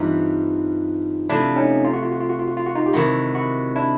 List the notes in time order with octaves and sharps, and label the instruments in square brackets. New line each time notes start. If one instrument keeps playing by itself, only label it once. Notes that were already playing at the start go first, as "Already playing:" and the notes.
Already playing: [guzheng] G2 E3 G3 C4 [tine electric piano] D#4 F4
[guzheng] C3 F3 A3 [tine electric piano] D4 E4
[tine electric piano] C#4 D#4
F4
F#4
F4
F#4
F4
F#4
F4
F#4
F4
F#4
D#4 F4
G4
[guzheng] C3 D#3 G#3 [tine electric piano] E4 F#4
[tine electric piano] E4 F#4
D4 E4